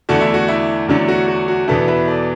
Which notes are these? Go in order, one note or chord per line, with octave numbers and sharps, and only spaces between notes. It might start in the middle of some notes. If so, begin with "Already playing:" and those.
E2 D3 A3 D4 F#4
E4
F#4
E4
E2 D3 F#3 A3 D4
F#4
F#4
F#4
E2 B2 B3 D4 E4 A4
B4 E5
A4 D5